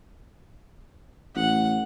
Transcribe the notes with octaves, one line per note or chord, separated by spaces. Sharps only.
A1 F#5